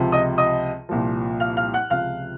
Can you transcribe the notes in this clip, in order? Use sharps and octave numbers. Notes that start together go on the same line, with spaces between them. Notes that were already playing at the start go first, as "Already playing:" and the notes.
Already playing: C#2 C3 F3
D#5 D#6
D#5 D#6
C2 A#2 F3
F5 F6
F5 F6
F#5 F#6
C#2 C3 F3 F5 F6